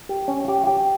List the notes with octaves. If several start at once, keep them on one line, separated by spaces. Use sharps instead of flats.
G4
C#4
G4
G4